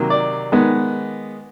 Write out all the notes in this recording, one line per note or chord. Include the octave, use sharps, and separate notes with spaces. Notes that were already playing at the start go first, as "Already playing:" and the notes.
Already playing: C3 D#3 F#3 A#3
D5
D#3 G#3 B3